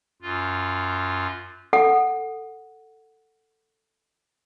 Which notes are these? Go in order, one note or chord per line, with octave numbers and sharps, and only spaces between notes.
F#2 F4
A4 F#5